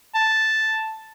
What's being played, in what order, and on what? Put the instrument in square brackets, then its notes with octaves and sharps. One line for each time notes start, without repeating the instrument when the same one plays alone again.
[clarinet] A5